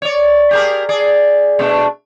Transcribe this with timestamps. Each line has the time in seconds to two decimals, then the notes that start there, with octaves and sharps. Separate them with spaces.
0.02 C#5 D5
0.51 G4 G#4 A#4
0.89 G#4 D5
1.59 B2 A3 D4